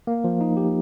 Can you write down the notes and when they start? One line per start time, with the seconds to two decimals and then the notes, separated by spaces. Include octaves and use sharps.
0.07 A#3
0.24 F3
0.41 D#4
0.57 G4